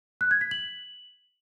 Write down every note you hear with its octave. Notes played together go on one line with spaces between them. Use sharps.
F#6
G#6
B6
F#7